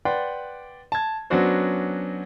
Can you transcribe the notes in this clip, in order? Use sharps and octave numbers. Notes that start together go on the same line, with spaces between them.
B4 D5 F#5 G5 C6
A5 G#6
F#3 B3 C#4 D4 F#4 C5